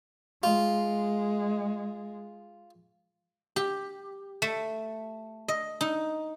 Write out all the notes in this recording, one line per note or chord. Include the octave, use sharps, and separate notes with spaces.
G#3 F4
G4
A3
D#5
D#4